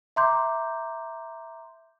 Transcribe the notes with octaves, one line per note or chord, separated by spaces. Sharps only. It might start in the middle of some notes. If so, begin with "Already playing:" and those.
E5 A#5 C6 D6 G6